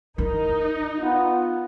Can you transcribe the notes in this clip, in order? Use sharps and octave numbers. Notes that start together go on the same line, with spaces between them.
D#4 E4 A#4
B3 F4